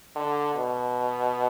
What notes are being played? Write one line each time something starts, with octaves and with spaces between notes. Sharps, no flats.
D3
B2